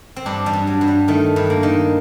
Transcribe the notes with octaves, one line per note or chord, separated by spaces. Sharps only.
C4
G2 D4
G3
G2
F#3
G2
G3
D#3 A3
G2
A#3
D#3